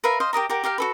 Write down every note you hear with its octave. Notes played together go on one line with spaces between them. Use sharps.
A#4 B4 E5 F5
C5 D#5 F5
G4 A#4 D#5 A#5
G4 A#4 F#5
G4 A#4 F5 G5
F#4 A4 B4